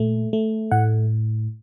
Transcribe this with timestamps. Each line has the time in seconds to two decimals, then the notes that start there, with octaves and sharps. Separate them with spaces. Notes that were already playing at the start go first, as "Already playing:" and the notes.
Already playing: A#2 A3
0.33 A3
0.71 A2 F#5